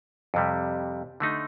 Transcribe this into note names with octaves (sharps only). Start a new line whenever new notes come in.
F2 C3 G3
D3 A3 D#4